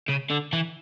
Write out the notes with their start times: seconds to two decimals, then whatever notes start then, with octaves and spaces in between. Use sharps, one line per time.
0.08 C#3
0.30 D3
0.53 E3